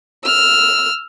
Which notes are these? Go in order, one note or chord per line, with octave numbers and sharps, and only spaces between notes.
E6 F6